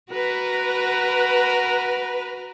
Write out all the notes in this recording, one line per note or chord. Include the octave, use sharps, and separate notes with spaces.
F#4 A#4 B4